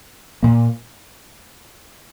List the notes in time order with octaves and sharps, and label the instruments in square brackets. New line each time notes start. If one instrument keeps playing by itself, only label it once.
[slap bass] A#2 A#3